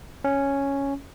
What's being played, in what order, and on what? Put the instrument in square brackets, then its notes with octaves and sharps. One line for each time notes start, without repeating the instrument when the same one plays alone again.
[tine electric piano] C#4